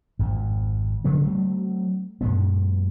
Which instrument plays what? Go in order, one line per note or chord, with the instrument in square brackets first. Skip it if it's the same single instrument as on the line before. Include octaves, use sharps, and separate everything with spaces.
[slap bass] G#1 F2
D2 C#3 F3 B3
F#3 A3 C4
F#2 A#2 G#3 B3